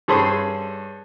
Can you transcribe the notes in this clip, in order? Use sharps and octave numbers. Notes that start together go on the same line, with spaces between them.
G2 C#4 G#4 A4 C5 B5